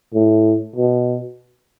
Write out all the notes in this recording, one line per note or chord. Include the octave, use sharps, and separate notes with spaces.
A2
B2